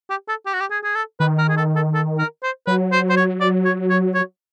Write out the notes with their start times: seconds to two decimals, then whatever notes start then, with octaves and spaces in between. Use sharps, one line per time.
0.10 G4
0.29 A4
0.46 G4
0.54 F#4
0.60 G4
0.71 G#4
0.84 G#4
0.95 A4
1.20 D#3 B4
1.38 A#4
1.49 G#4
1.57 A4
1.76 A4
1.93 A4
2.18 A#4
2.43 C5
2.67 F#3 B4
2.92 C5
3.10 C5
3.16 C#5
3.41 D5
3.65 C#5
3.90 C#5
4.14 C#5